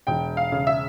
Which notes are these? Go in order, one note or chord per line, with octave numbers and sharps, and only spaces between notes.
E1 G5
F5
C#3
E5